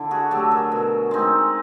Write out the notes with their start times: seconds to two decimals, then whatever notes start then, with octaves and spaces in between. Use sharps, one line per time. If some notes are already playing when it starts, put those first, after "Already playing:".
Already playing: D3 E4
0.11 F#4 G#4
0.31 F#3 A3 G4 A4
0.51 G#4 A#4
0.72 B2
1.11 G#3 C4 D#4